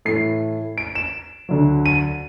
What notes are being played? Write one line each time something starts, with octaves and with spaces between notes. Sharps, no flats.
A2 E3 A3 C7
D7
E7
D2 D3 F#3
D#7